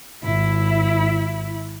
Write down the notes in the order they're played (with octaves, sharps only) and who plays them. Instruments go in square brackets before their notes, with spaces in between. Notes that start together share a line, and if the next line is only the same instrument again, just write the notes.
[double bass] G#1 [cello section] E4